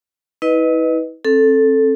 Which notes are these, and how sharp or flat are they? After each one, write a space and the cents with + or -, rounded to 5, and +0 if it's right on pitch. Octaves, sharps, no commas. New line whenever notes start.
E4 -40 B4 +0 D#5 +0
C4 +35 A4 +0